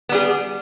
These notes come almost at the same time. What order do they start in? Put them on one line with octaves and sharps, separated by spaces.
B3 G3 G#4